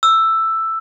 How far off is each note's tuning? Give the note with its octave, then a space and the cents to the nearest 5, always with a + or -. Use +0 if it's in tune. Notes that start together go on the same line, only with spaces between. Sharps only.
E6 +5